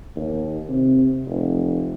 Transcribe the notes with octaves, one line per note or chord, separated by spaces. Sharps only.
D#2
C3
F1